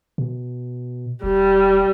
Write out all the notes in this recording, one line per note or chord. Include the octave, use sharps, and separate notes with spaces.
B2
E1 G3